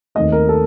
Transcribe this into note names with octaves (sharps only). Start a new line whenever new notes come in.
D#2 D#3 A3 C4 D#5
A#4
A4